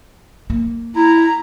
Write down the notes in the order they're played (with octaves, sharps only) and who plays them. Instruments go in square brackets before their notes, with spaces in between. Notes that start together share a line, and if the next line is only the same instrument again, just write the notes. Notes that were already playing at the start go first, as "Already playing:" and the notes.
[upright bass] A#3
[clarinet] E4 [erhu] A#5